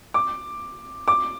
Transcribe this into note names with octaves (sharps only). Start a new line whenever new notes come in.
D6
D6